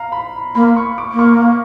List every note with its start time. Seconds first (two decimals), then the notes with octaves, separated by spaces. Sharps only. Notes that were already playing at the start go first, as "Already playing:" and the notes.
Already playing: F5 A#5
0.12 B5
0.55 A#3 B5
0.76 C#6
0.98 D6
1.12 A#3
1.19 C#6